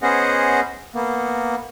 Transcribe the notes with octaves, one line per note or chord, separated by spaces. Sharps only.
B3 C#4 G#4 C5 D#5 F#5
A#3 B3